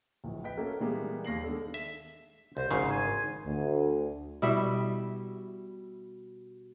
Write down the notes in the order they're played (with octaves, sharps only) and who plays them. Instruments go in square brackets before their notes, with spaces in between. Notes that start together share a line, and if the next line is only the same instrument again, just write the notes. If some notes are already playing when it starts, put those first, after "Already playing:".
[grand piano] D1 A#1
B4 D#5 G5 B6
A3 A#3 C#4 F#4 A4 A#4
A#2 E3 G3 G#3 A#3 B3
D#2 A#6 C7 F#7
D#3 G#3 B3 D4 A4
[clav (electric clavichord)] E5
[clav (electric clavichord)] C2 [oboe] C5
[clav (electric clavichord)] G#1 G#2 C#3 [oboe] C6
[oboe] G#5
[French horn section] D2
[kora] B2 G3 E4 E5